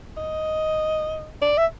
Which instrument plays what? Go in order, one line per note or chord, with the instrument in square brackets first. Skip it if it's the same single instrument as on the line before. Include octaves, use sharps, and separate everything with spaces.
[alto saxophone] D#5
D5
E5